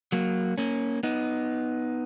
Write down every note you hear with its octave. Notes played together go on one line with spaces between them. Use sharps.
F#3 A#3
A#3 C#4
B3 D#4